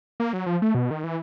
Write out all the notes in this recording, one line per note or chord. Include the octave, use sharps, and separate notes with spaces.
A#3
F#3
F3
A3
B2
D#3
E3